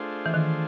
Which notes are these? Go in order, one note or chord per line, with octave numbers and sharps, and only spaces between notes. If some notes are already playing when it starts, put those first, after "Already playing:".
Already playing: A3 D4 F4 G#4 C5
E3
D#3